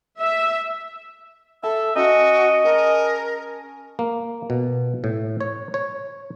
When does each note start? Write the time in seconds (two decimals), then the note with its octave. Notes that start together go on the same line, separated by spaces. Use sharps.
0.20 E5
1.63 A4 E5 A5
1.96 C#4 F#4 D#5
2.64 G#4 A#4 A5 A#5
3.99 A#3
4.50 B2
5.04 A2
5.40 C#5
5.74 C#5